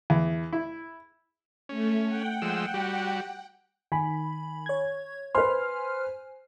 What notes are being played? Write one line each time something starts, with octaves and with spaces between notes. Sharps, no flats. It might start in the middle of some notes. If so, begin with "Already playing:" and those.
E2
E4
A3 C#4
F#5 G5
F3 G#3 E6
G3 F#4
D#3 G#5 B5
C#5 G#6
B4 C5 G#5 C6 F6